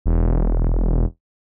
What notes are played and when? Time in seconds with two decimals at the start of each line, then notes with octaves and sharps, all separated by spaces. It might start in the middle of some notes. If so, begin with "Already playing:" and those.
0.06 E1